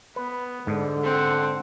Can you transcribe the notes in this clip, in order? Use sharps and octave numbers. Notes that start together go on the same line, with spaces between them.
B3 B4
G#2 D3
C4 F#5